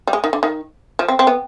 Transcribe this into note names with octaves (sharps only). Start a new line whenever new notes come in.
G3
G#3
D#3
D3
D#3
F3
C4
C4
B3